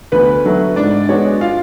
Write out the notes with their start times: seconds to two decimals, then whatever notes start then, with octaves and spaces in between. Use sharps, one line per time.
0.12 D2 B3 B4
0.44 D3 F#3 A3
0.76 G#2 D4 D5
1.09 G#3 B3 F#4 C#5
1.41 F4 F5